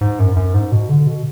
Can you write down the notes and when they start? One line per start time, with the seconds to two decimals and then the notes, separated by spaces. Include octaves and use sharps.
0.01 G#2
0.19 F#2
0.36 F#2
0.54 G#2
0.72 B2
0.89 D3
1.07 B2